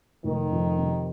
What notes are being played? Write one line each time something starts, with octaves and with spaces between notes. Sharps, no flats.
F1 D#3
F2
C3